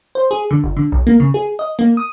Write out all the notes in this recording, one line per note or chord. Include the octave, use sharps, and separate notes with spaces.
C5
G#4
D3
G1
D3
B1
A#3
C#3
G#4
D#5
A#3
D#6